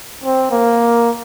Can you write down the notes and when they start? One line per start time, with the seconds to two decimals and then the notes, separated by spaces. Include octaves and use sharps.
0.24 C4
0.51 A#3